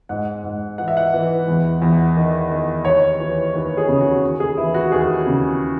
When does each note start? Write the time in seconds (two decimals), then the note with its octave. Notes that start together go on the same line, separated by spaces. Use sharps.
0.09 G#2 F#5
0.44 G#2
0.78 E3 F#5
0.88 E5
0.97 F#5
1.13 E3
1.48 E2
1.82 E2
2.16 D#3
2.51 D#3
2.85 D#2 C#5
3.20 E3
3.54 D#2 B4
3.77 G#4
3.88 C#3
4.01 F#4
4.23 D#2
4.40 G#4
4.57 E3 E4
4.74 F#4
4.92 D#2 G#4
5.26 C#3